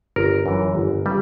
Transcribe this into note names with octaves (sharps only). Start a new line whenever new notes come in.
G1 A#4
F#2 E3
G1
C#3 G3